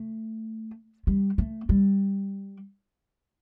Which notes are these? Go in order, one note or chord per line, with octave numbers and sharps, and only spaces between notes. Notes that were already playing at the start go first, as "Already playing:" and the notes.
Already playing: A3
G3
A3
G3